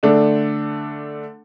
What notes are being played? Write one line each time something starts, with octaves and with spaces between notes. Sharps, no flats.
D3 A3 D4 A4